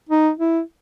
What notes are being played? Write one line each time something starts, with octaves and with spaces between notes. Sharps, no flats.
D#4
E4